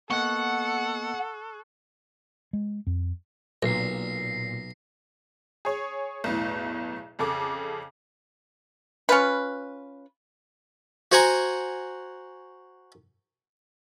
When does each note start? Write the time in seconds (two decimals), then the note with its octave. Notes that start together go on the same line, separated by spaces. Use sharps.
0.10 A#3 B3 A4 D#5 F#5 C#6 F#6
2.53 G#3
2.87 F2
3.63 B1 A#2 A#6 C7
5.65 G#4 C#5
6.24 B1 E2 A2
7.19 F2 C#3 A4 D6
9.09 C#4 F4 B4
11.12 F#4 C5 F#5 G#5 A#5 C#6